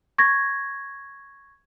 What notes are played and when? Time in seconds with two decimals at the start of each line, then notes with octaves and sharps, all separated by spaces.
0.18 C#6 G#6 A#6